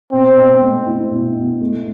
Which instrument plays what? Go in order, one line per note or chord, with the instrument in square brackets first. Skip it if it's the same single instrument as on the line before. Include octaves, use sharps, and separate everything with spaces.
[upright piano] B2 [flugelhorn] C4
[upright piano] B2
A3
E4
B2
B2
A3